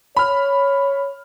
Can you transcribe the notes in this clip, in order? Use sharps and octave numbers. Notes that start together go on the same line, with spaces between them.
C#5 B5 F6